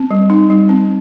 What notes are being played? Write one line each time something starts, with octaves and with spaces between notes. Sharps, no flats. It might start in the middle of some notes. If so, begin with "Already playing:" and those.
Already playing: C4
G3
D#4
G3
C4